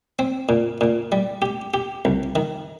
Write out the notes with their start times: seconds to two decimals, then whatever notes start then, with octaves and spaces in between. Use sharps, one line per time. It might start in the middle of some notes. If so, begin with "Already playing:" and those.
0.19 C4
0.49 A#2
0.81 A#2
1.12 G3
1.42 G4
1.74 G4
2.05 C2
2.36 D#3